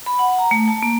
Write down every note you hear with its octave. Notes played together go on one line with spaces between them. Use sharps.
B5
F#5
A#5
A3
A5
A#3